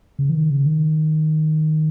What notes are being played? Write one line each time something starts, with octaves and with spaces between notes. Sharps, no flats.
C#3
E3
D#3
C#3
D#3